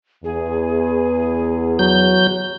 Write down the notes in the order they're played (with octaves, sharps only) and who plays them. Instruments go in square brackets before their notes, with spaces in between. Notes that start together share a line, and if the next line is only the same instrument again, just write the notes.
[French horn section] E2 [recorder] G#4
[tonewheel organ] F#3 G6